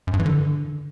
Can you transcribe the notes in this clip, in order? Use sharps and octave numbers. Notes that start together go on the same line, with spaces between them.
F#2
G2
E3
D3